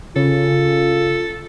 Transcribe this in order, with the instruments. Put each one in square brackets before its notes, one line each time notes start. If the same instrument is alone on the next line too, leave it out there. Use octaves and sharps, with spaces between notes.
[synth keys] C#3 [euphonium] F4 [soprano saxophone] A4